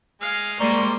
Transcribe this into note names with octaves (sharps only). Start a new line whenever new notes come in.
G#3 F5
G3 G#3 A#3 C5 D5 A#5 C#6